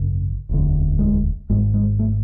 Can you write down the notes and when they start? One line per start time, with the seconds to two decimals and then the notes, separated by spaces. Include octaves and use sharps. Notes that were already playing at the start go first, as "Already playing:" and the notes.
Already playing: G#1 F#2 C#3
0.49 E1 D2 D3
0.99 G#3
1.50 G#1 G#2 G#3
1.74 G#3
1.99 A3